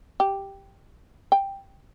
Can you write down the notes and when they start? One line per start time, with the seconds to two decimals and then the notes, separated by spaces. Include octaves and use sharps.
0.20 G4
1.32 G5